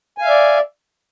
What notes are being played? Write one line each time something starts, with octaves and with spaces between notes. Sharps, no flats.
D5 E5 F5 G#5